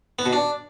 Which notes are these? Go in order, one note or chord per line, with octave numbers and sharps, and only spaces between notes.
B3
B2
D4